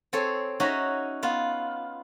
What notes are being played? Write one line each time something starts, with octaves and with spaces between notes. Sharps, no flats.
C4 G#4 A4 C#5
C#4 D#4 F#4 E5 A#5
B3 F4